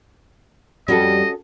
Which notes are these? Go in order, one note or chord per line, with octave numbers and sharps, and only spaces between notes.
F2 G3 C#4 F#4 A4 D#5